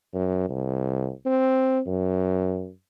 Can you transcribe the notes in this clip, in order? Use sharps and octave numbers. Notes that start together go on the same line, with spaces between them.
F#2
C2
C4
F#2